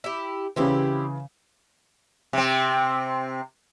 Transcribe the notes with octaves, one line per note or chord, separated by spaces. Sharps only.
E4 G4
C#3 E3 C4 E4 G4
C3 C4